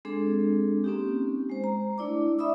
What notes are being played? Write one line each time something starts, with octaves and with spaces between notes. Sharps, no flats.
G#3 C4 D4 G#4 A4
A#3 C4 C#4 D#4 G4
G#3 C5
A#5
A3 D4 E4 D5 D6
D5 E5 B5 D#6 E6